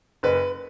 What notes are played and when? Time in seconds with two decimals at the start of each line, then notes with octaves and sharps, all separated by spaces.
0.23 F#1 B4